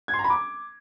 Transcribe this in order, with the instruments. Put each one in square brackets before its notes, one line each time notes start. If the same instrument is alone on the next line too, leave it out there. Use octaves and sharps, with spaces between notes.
[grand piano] G#6
C6
A#5
B5
D6